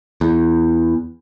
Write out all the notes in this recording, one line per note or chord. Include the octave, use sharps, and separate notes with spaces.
E2